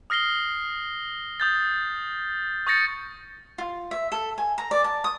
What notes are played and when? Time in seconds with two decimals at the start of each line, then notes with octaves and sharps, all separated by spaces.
0.10 D#6 F6 A#6 C7 G7
1.40 D#6 G6 A6
2.67 C#6 D#6 G6 A6 A#6 C#7
3.58 F4
3.91 E5
4.12 A4
4.38 G#5
4.58 A#5
4.71 D5
4.84 A5
5.04 D#6